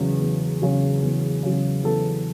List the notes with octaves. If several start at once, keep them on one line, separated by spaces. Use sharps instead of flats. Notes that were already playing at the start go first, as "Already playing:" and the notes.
Already playing: E2 C#3 F#3
E2
C#3 F#3
E2
C#3 F#3
E2 A4